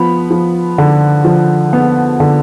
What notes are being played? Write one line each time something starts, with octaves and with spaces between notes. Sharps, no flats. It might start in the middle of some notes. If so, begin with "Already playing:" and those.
Already playing: F3 B3 B5
F3
D3
F3
B3
D3